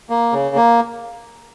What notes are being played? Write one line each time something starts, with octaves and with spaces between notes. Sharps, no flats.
A#3
C#3
A#3